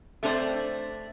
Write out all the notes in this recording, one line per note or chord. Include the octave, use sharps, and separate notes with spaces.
A3 C4 D4 B4 C5 D5